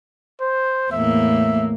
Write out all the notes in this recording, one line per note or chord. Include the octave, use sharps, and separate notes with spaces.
C5
E2 A2 A#3 E5